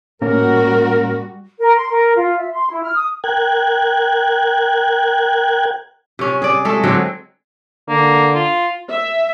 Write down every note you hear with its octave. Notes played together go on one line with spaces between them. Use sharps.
A2 G3 A#3 C#4 F#4 A#4
A#4
C6
A#4
F4
E5
C6
E4
F6
D#6
A#4 G5 F#6 G#6
C3 C#4
G#4 D5
G#3 A3 G#4 A4
D3 F#3 G#3 C4
D3 A#3
F4
E5